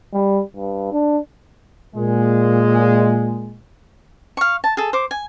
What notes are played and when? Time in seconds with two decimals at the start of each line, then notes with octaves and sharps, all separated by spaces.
0.14 G3
0.56 G2
0.92 D4
1.95 A#2 G#3
4.37 F5 C#6
4.64 A5
4.77 G#4 A4
4.93 C5 D6
5.11 G#5